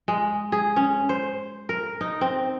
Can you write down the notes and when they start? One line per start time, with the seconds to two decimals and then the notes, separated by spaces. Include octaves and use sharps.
0.08 G#3
0.52 G#4
0.76 C#4
1.09 C5
1.69 A#4
2.01 D#4
2.21 C4